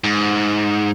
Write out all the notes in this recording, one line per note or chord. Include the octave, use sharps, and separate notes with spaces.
G#2